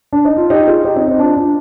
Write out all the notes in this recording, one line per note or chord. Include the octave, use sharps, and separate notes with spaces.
D4
D#4
F4
D#4 G4
F4 G#4
D#4 G4
C4 D#4
C4 D#4
D4 F4
D4 F4